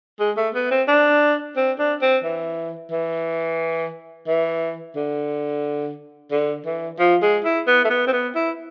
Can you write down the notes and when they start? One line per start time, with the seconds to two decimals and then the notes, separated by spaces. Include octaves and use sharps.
0.20 G#3
0.37 A3
0.55 B3
0.71 C4
0.88 D4
1.57 C4
1.79 D4
2.02 C4
2.24 E3
2.92 E3
4.28 E3
4.96 D3
6.32 D3
6.66 E3
6.99 F3
7.22 G#3
7.44 E4
7.67 B3
7.85 A3
7.90 B3
8.07 C4
8.13 B3
8.35 E4